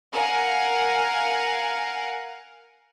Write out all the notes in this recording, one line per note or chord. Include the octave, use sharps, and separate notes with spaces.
A#4 F5 F#5 G#5